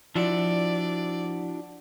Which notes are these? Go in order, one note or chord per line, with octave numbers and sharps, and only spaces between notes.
F3 D4 E4 F#4 D5